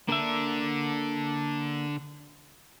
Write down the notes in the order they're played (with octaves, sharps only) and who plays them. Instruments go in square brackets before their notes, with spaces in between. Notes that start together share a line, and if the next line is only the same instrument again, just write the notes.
[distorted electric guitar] D3 D4 [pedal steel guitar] A#3 E5